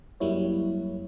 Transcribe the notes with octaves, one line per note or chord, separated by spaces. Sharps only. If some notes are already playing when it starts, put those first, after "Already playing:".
F#2 F#3 G3 A#3 E4 C#5